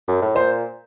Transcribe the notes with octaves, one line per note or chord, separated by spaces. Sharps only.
F#2
A2
A#2 C5